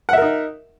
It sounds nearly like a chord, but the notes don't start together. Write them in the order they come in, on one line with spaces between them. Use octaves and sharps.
F#5 E5 A#4 D#4